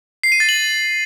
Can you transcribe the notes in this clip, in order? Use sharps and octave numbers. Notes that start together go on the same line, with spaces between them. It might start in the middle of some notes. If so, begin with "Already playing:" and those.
C7
D#7
A6
F#7